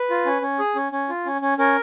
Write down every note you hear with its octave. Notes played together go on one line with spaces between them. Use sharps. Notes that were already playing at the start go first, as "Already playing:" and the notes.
Already playing: B4
F4
C#4
C#4
G#4
C#4
C#4
F4
C#4
C#4
C#4 A#4